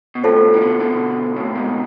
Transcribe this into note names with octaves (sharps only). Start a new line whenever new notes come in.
B2
A2 C3 F4 A4 C5 F5 A5
E3
B2 D3
B2 D3
A2 C3
G#2 B2